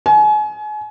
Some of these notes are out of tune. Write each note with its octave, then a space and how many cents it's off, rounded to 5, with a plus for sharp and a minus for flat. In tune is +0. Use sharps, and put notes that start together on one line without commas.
G#5 +35